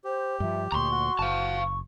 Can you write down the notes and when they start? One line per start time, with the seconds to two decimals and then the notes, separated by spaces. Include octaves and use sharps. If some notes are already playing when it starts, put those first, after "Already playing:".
0.04 G4 C5
0.40 G2 F3 E5
0.72 D2 A#2 A#5 C6 C#6
0.91 F#4
1.19 F#1 F5 A5
1.58 C#6